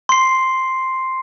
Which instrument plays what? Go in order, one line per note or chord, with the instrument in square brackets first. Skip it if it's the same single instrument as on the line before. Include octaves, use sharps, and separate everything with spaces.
[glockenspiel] C6 C7